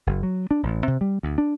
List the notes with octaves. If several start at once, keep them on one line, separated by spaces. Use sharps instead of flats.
F#1
F#3
D4
A1
C3
G3
D2
D4